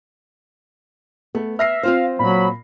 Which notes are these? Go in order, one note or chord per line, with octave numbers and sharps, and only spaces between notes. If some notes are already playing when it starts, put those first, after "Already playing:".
A3 B3
E5 F6 A#6 C7
C4 F4 C5 F5
A#2 F#3 B5